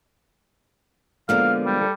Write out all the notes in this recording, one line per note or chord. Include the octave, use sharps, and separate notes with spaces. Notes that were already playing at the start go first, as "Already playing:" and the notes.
D3 F3 G#3 A#3 B3 F5
G3
A4